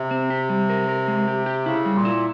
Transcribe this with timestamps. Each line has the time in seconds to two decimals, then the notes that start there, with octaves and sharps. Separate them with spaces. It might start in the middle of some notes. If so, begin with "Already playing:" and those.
Already playing: C3
0.11 C4
0.30 G4
0.49 G3
0.69 A#4
0.89 A#4
1.08 G#3
1.28 G4
1.46 G4
1.66 C#3 E4
1.86 G3
1.95 A#2
2.05 E4